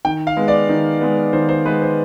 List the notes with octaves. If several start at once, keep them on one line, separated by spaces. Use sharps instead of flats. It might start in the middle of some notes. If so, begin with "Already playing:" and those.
D#3 G5
F5
G#3 B3
D5
D#3
G#3 B3
D#3 C5
C5
G#3 B3 B4
C5